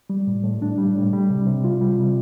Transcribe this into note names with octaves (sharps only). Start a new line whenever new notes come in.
G3
A2
A2
D4
G3
A2
G3
C3
C3
F4
G3
C3